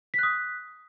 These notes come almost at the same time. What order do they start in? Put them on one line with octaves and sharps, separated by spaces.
B6 F#6 D#6